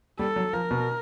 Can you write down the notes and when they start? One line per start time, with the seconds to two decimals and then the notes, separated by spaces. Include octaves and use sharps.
0.19 G3 A4
0.36 F#3
0.53 F3 A#4
0.71 B2